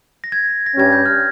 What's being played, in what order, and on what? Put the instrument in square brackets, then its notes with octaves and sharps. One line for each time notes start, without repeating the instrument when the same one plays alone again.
[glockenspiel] A#6
G#6
A#6
[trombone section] G2 G3 C#4 [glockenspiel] G#6
[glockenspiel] G6
F6